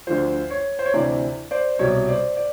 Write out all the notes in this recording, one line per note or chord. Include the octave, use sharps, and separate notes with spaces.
D2 D3 F3 C5
C#5
C5
C#5
D2 C3 E3 C5 D5
C5 D5
C2 B2 G3 C#5
C5 D5
D5